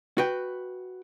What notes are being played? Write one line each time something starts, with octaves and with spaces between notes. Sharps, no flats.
F#4 B4 G5